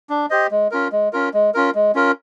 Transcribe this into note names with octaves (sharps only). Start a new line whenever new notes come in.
D4
G4 C5 D#5
G#3
C#4 F4 A#4
G#3
C#4 F4 A#4
G#3
C#4 F4 A#4
G#3
C#4 F4 A#4